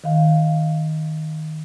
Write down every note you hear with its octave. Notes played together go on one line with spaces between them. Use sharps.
D#3 F5